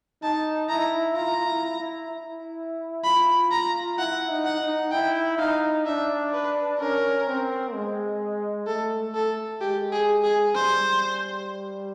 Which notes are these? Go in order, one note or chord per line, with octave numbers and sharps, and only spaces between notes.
D#4 A5
E4 A#5
F4 A#5
E4
E4
E4
F4 B5
A#5
E4 F#5
D#4
F#5
D#4
E4 G5
D#4 F5
D4 E5
B4
C#4 A#4
C4
G#3
A3 A4
A4
G#3 G4
G#4
G#4
G3 C5